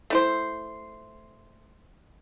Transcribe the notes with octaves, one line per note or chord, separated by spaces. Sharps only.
A3 E4 C5